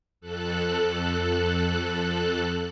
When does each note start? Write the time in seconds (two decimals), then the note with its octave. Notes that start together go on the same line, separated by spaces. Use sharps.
0.21 F2 A4 F#6